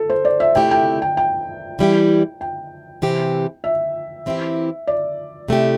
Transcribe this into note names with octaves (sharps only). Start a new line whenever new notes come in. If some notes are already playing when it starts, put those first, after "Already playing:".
Already playing: A4
C5
D5
E5
C3 A3 E4 G4 G5
G5
G5
G5
E3 G3 E4 G4
G5
C3 E3 C4 G4
E5
E3 C4 E4 G4
D5
C3 A3 E4 G4